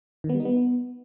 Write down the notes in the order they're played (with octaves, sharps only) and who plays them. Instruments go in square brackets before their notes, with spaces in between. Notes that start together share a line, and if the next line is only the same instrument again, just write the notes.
[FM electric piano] D#3
B3
G3
D#4
B3